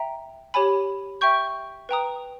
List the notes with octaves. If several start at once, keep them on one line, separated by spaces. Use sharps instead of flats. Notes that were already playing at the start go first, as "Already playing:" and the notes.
Already playing: E5 G5 A#5
G4 C#5 G#5 B5
E5 G5 C#6 G6
B4 G5 A#5 D#6